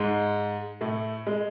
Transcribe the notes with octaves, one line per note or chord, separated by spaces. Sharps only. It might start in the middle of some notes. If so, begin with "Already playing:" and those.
Already playing: G#2 G#3
A2 A3
G#3